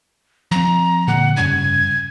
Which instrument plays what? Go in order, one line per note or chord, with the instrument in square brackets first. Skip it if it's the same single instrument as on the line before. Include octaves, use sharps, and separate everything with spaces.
[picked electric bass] F3 C4 [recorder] A#5
[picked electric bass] A#2 D3 A#3 [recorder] F#5
[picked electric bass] F1 G2 C#3 [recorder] G#6